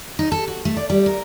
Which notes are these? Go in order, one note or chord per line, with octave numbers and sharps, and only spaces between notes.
D#4
A4
F#4
A3
D5
G3
A#4